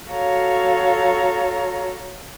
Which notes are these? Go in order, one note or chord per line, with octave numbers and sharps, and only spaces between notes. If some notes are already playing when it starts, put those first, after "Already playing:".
F#4 A4 C#5 F5 A#5